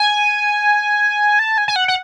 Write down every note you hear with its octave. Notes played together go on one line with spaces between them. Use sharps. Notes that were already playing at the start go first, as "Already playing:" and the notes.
Already playing: G#5
A5
G#5
G#5
F#5
F#5